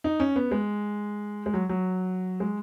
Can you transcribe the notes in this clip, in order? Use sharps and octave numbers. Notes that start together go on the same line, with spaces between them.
D#4
C#4
B3
G#3
G#3
F#3
F#3
G#3